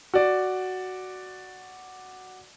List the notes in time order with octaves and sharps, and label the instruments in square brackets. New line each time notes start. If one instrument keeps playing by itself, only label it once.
[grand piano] F#4 D5